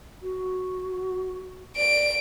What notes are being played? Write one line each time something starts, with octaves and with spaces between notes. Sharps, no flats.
F#4
D5 D7